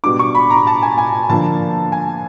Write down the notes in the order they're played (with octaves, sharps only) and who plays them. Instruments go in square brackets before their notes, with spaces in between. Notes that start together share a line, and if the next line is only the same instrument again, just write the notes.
[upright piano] B2 G3 B3 D4 D6
C#6
B5
A#5
A5
G#5
G#5
D3 F3 A#3 D4 A5
G#5